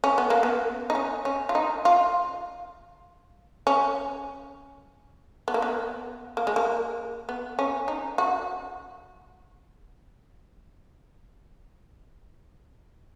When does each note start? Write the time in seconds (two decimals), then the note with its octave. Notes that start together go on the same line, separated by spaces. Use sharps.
0.04 C#4
0.18 B3
0.30 A#3
0.43 B3
0.90 D#4
0.95 C#4
1.25 C#4
1.49 F4
1.55 D#4
1.85 F4
3.67 C#4
5.48 B3
5.54 A#3
5.62 B3
6.37 A#3
6.47 G#3
6.56 A#3
7.29 B3
7.59 C#4
7.88 D#4
8.18 F#4